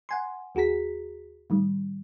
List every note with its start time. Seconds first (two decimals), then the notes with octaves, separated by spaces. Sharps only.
0.09 F#5 G#5 C6
0.55 D#2 F#4 G#4 A#5 B6
1.50 A2 D#3 G3